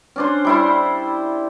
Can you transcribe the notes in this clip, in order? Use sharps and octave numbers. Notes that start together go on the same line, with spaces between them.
C#4 D4 C5
G3 E4 C5